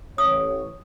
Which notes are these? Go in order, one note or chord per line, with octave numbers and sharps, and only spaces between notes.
A1 C#5 D#6